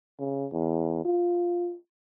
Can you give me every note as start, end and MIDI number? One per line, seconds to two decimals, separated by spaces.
0.19 0.47 49
0.53 1.05 40
1.05 1.75 65